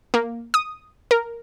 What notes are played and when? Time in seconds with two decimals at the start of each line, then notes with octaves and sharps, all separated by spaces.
0.14 A#3
0.54 D#6
1.11 A#4